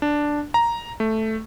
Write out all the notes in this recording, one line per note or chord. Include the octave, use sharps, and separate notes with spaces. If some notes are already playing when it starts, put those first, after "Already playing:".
D4
A#5
A3